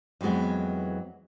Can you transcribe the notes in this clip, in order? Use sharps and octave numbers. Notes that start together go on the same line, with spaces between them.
F2 E3 F#3 G#3 B3